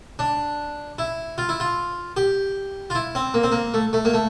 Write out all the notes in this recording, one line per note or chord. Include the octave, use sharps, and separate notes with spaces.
D4
E4
F4
E4
F4
G4
F4
E4
C4
A#3
C4
A#3
A3
A3
A#3
A3